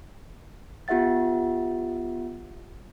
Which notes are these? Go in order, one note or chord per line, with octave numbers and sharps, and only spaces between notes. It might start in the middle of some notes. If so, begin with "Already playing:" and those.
B3 F4 G4 E5 F#5 A6